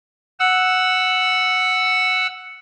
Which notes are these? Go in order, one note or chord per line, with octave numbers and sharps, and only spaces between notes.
F#5 E6